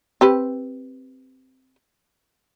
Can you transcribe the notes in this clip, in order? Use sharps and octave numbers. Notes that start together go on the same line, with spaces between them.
C4 G4 B4